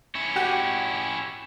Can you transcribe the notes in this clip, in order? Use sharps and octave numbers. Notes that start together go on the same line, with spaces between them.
C#4 E4
F#4 G4